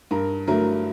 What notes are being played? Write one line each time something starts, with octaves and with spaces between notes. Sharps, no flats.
G2 A#4
D3 F#3 A3 A#4